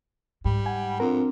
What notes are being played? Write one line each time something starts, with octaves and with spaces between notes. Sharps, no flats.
G#2 G3
F#5 G#5
F2 C4 D4 A#4